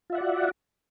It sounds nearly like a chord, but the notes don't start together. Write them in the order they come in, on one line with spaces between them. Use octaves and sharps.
F4 E5 F#5 D5 F#4